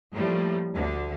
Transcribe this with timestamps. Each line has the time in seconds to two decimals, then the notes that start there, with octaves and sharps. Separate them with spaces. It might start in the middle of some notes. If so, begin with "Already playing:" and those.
0.13 A2 F3 G3 A3 A#3
0.73 D2 D3